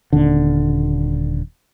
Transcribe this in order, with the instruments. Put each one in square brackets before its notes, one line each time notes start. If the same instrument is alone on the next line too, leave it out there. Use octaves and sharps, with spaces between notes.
[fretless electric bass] D#1 D3